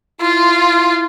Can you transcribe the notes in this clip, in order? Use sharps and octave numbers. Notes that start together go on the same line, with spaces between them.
E4 F4